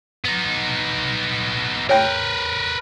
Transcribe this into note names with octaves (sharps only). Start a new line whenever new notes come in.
B3 D#4
A#4 B4 C#5 G5